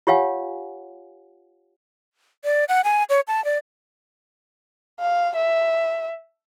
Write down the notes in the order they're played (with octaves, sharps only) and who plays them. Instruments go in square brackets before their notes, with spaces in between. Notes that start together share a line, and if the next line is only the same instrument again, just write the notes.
[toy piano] F4 G4 C#5 F5 F#5 G#5
[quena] D5
F#5
G#5
C#5
A5
D5
[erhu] F5
E5